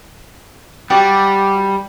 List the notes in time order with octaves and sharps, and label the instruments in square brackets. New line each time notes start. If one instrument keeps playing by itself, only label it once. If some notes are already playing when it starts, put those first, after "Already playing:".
[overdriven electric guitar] G3 [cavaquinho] F#4 G4 D5